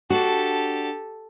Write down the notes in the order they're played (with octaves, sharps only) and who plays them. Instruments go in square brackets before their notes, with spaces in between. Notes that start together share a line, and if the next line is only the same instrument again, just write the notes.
[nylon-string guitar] D4 F#4 [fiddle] G4 A4